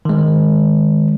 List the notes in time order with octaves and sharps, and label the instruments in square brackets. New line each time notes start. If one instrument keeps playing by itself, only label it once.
[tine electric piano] D#3 G#3